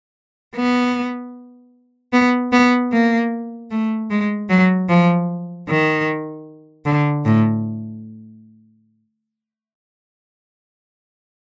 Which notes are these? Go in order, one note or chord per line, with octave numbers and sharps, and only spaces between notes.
B3
B3
B3
A#3
A3
G#3
F#3
F3
D#3
D3
A2